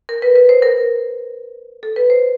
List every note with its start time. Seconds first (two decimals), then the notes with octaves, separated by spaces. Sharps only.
0.09 A#4
0.22 B4
0.36 B4
0.49 C5
0.62 A#4
1.83 A4
1.96 B4
2.10 C5